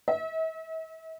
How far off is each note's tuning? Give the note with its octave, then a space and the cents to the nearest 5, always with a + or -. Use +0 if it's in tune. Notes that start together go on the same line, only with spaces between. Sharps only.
E5 -45